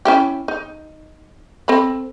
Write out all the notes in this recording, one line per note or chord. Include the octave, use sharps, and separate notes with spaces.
C#4 E4 G4
D#4
C4 A4 B5